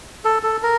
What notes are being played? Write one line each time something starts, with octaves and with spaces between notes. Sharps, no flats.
A4
A4
A#4